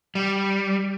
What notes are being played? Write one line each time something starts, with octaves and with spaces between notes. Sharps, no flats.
G3